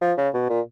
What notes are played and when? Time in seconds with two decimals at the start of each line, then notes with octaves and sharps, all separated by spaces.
0.02 F3
0.17 C#3
0.34 B2
0.49 A#2